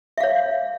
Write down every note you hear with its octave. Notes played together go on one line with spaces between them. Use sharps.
C#5 E5 F5